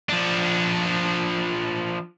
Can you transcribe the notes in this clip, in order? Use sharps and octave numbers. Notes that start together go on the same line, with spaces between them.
F3 D4